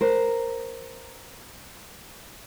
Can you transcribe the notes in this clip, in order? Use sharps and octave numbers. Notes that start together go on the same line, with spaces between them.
A#4 C5